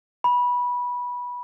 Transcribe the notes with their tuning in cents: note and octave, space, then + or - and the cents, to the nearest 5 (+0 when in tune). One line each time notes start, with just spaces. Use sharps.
B5 -15